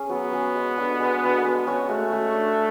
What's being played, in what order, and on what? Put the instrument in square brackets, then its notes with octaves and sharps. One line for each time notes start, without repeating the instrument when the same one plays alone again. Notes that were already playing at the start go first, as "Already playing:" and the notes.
Already playing: [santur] C#4 G#4
[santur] F#3 [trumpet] B3
[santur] C#4 G#4
G#3
D4 F#4 A4
G#3
D4 F#4 A4
[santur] G#3 [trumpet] B3
[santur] C#4 F#4 C#5
[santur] G#3 [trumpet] A3
[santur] C#4 F#4 C#5
D4